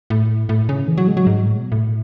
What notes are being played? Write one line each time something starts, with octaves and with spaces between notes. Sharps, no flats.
A2
A2
C#3
E3
F#3
G#3
F#3
G#2
A2
B2
A2